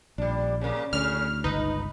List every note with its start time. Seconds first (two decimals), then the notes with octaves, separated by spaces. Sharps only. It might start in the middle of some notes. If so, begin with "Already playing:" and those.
0.18 A#1 G3 D4
0.61 C#3 A#3
0.93 D2 A2 C#3 F6
1.44 G1 C#2 D#4 B4